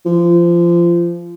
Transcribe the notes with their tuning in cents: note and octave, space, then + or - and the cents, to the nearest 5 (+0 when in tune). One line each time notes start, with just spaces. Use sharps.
F3 -25